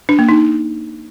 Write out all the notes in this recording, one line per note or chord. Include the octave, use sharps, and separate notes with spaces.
D4
A#3
D#4